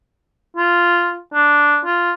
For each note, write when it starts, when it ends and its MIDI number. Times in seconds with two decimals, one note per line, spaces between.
0.57 1.18 65
1.34 1.79 62
1.86 2.12 65